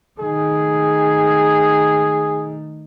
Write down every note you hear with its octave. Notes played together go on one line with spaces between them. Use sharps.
D#3 A3 G#4